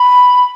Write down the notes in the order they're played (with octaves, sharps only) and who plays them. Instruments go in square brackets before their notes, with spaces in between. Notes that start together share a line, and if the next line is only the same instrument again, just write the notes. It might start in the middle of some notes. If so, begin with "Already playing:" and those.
Already playing: [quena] B5